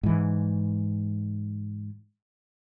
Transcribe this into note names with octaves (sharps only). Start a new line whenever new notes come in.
G#2 E3